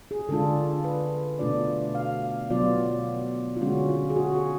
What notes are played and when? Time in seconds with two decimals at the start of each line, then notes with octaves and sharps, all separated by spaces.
0.11 G#4
0.29 D3 G#3 D4 F4 A4
0.84 B4
1.39 B2 A3 D4 F4 D5
1.95 F5
2.50 B2 F#3 B3 F4 D5
3.56 F4
3.61 D3 G#3 C#4 F#4
3.89 F4
4.10 G#4
4.16 F#4
4.35 G#4